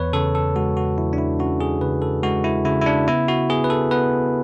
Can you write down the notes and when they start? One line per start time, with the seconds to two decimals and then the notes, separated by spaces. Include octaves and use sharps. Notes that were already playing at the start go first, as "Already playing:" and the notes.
Already playing: E2 B4 C#5
0.13 C#3 A4
0.35 A4
0.56 G#3 F#4
0.77 F#4
0.98 E2 E4
1.13 D4
1.18 E4
1.39 C#4 F#4
1.61 G#4
1.81 C#3 B4
2.02 A4
2.23 G#3 F#4
2.44 E4
2.65 C#3 E4
2.81 E4
2.86 D4
3.08 B3 E4
3.28 F#4
3.49 B3 G#4
3.64 B4
3.70 A4
3.91 B3 B4